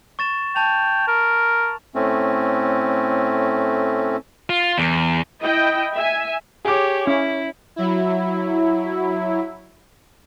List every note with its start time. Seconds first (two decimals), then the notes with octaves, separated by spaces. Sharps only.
0.19 C#6 A6 E7
0.56 G5 A5 F7
1.08 A#4
1.95 A2 A3 C4 C#4
4.50 F4
4.78 E2
5.41 E4 D#5 G5
5.94 E5 G#5
6.65 G4 G#4 C#5 D6
7.07 C#4 E4
7.76 F#3 E4